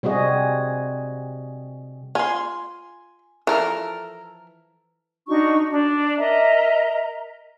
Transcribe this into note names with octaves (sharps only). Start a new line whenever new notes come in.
C3 G3 C4 F#4 G#4 D#5
F4 G#5 C6
E3 F3 A4 A#4
D4 D#4 F#4 C#6
D4
A#4 D#5 E5 A#5